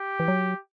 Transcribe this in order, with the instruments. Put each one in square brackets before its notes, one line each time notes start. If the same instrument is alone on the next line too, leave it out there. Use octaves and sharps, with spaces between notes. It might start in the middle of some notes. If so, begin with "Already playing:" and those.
Already playing: [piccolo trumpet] G4
[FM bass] E3
F#3